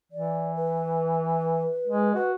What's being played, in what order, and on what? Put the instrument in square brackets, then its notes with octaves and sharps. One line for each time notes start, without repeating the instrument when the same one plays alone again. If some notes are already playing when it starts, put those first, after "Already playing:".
[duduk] E3 [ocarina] D5
[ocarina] B4
[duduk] G#3
[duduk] F#4 [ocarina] B4